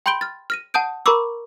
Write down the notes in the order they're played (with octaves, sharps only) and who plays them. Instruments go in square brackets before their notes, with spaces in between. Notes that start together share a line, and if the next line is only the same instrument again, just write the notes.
[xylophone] G5 B5 C6 G6 D7 G7
F6 A6
F6 A#6 D#7
F#5 A5 D#6 G6 D7
A#4 A#5 B5 C#6 D6 E6